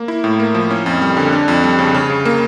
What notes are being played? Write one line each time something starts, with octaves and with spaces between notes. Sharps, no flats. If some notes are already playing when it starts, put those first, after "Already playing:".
Already playing: A#3
E4
A2
A#3
F3
C#4
F2
G3
D3
D4
F2
G3
C#3
C#3
C#3
A#3